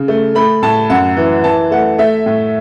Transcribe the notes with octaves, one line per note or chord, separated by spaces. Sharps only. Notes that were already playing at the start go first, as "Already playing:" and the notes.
Already playing: C#3
A3
A3 B5
A2 A5
F#2 F#5
E3
E3 A5
A3 F#5
A3 E5
A2